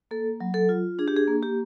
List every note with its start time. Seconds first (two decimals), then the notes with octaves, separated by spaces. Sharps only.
0.11 A#3 A4
0.40 F#3
0.54 A4
0.69 F4
0.99 D4 G#4
1.08 G4
1.17 G#4
1.28 A#3
1.43 G4